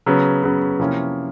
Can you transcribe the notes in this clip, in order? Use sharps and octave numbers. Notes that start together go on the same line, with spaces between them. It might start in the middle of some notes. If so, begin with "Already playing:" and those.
C#3 F#3 B3
C#3 F#3 B3
C3 F3 A#3 C#4 E4